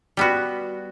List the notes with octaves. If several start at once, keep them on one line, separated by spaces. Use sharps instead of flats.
G3 B3 F#4